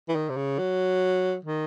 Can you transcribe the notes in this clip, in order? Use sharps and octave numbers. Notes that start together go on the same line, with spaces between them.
E3
D#3
C3
C#3
F#3
D#3